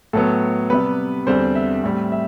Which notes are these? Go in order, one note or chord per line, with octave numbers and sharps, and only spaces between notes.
A2 F#3 B3 A4
C3 G3 B3 B4
E2 D3 G3 C4 C5
E5
A2 G3 C4
E5